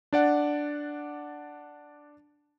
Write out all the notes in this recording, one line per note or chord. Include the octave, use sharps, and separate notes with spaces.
D4 D5 F#5